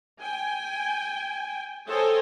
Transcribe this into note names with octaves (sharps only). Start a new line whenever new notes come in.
G5 G#5
A4 C5 C#5 D#5 G5 G#5